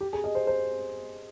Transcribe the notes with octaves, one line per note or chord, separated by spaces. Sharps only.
G4
G#4
D#5
C5
C5